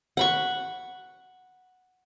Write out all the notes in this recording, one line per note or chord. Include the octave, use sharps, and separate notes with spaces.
F#5 B5 C#6